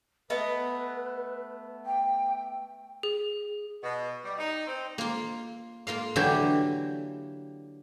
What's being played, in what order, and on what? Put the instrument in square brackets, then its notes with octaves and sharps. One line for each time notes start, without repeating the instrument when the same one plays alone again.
[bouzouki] A3 B3 D#5 [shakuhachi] B4
[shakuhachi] G5
[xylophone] G#4
[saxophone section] B2
G3
D#4
C4
[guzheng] A#3 F4
A#3 F4 A#4 F5
D3 E3 F#3 E4 F#4 G4